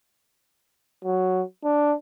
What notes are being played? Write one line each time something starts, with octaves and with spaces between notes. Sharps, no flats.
F#3
D4